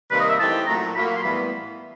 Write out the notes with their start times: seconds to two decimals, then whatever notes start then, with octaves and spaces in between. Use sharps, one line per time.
0.10 C3 D#3 G3 A#3 B4
0.20 D#5
0.29 E5
0.39 E3 A3 C4 D#4 G4 A5
0.66 A#2 F#3 A3 A#5
0.95 A#2 F#3 A#3 B5
1.16 C6
1.22 A2 E3 G3 B3 B5